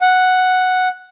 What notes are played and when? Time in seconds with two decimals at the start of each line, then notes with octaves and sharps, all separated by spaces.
0.01 F#5